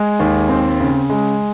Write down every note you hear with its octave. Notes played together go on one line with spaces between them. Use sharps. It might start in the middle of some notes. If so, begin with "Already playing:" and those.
Already playing: G#3
D#2
C4
C#3
G#3